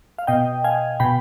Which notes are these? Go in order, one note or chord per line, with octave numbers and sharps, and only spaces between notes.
F5
B2 D#5 G5
F5 G#5
B2 G5 B5